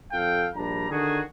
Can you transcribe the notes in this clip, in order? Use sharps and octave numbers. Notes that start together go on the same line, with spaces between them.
F2 A4 F5 G5
A#1 G3 D4 A#5
D3 D#3 D4 F#4 G#4